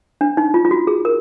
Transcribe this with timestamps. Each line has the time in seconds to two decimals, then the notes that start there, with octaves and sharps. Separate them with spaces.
0.21 D4
0.37 D#4
0.54 F4
0.65 F4
0.71 F#4
0.87 G#4
1.05 A#4